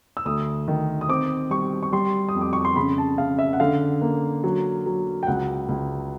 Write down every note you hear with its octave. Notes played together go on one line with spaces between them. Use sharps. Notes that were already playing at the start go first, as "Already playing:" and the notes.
E6
D2 D#6
D#3
D#6
C4 D6
G3 C#6
C#6
G3 C6
D#6
F2
D6
C#6
C6
C#3 B5
A5
C#3 F5
E5
F#5
D3 F5
A#3
F#3
F#3
G5
C#2 F#5
C#2